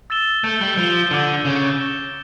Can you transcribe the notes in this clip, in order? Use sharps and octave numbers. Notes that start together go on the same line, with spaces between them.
E6 A6 E7 G7
A3 G6 D7 G7
G3
F3 G6 D7 G7
D3 D6 F6 C#7 E7
C#3 D6 F6 C#7 E7
F6 A#6 E7 G7